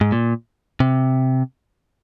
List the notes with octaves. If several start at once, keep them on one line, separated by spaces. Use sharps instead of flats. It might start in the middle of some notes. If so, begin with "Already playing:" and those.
G#2
A#2
C3